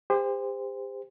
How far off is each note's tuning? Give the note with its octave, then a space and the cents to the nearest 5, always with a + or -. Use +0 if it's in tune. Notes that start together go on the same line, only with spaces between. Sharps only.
G4 +40 C5 -15